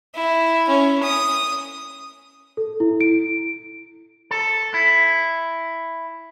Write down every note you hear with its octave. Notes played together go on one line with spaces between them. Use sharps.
E4
C#4
D#6
A4
E4
D7
A4
E4